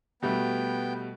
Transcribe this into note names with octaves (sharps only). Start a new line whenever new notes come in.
B2 G3 A3 B3 G5